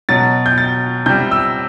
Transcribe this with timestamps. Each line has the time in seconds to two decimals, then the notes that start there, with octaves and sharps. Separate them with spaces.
0.09 B2 F#3 A6
0.46 G6
0.58 A6
1.06 C3 G3 G6
1.31 E6